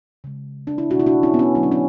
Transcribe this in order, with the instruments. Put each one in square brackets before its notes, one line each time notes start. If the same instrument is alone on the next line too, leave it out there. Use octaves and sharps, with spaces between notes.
[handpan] C#3 G#3
D4
E4
B2 A3 D4 F#4
E4
D4 F#4
C#4 E4
B3
C#4
D3 F#3 A3 E4
D4
C#4